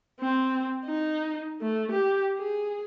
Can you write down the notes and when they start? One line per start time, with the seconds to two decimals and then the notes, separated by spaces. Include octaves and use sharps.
0.20 C4
0.85 D#4
1.61 A3
1.91 G4
2.38 G#4